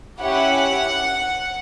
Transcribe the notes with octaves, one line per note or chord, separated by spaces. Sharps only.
C#4 E4 G4 F#5